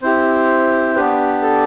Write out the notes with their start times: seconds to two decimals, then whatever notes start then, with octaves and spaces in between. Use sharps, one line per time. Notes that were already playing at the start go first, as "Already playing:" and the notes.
0.02 C4 E4 G4 C5
0.95 B3 D4 G4 B4
1.42 A4